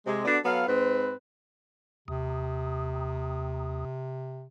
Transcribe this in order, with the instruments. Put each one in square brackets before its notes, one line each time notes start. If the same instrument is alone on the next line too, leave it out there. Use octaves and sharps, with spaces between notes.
[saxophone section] C3 G#3
B3 D4 F#4 A4 D5
F#3 B3 A4 F5
G#2 C4 B4
[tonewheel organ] D#2 [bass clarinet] C3